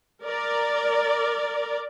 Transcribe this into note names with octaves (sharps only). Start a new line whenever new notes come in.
A#4 D5